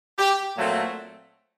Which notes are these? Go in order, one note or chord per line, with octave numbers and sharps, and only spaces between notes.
G4
A#2 F#3 A3 C4